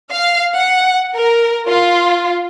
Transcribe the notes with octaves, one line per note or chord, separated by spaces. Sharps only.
F5
F#5
A#4
F4